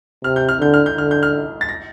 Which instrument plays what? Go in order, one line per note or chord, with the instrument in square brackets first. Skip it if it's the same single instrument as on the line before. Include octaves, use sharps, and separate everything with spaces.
[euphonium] C3 [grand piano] F6
[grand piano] G6
F6
[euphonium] D3 [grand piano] G6
[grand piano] F6
G6
[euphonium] D3 [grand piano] F6
[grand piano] G6
F6
A6
A#6